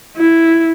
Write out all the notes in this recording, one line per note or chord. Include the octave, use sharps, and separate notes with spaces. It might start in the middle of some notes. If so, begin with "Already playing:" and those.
E4